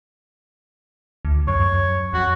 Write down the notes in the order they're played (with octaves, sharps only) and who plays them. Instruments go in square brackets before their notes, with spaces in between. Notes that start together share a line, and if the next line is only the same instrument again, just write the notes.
[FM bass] D2
[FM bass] F#2 [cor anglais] C#5
[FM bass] F#2
[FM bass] F2 [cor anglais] F#4